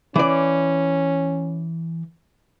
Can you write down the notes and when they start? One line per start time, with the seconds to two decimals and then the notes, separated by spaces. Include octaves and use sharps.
0.16 E3 C#4 D5